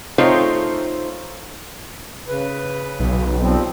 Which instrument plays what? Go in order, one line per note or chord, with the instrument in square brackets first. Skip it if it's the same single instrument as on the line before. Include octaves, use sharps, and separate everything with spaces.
[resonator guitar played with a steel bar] A3 C4 D#4 F4 C5 C#5
[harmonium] C#3 B4
[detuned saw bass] B1
[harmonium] F3 G3 C4